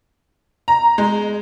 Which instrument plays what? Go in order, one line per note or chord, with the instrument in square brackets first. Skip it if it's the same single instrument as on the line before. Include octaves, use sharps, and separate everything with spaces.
[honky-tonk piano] A#5
G#3